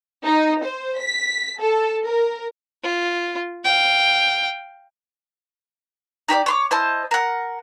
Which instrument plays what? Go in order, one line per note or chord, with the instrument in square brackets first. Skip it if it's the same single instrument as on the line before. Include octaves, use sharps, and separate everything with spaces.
[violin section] D#4
C5
B6
A4
A#4
[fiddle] F4
F5 G5
[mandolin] D#4 G4 C5 D5
C#5 C6 D6
E4 C5 D#5 A5
A#4 F#5